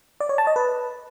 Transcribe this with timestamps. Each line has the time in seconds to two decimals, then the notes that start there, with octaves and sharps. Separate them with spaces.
0.20 D5
0.29 C#5
0.38 A5
0.47 D#5
0.56 B4